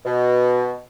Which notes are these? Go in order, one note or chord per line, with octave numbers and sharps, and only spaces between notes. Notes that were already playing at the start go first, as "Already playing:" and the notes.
B2